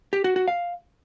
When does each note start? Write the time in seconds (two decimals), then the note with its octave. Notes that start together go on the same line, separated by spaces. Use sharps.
0.13 G4
0.24 F#4
0.36 F#4
0.48 F5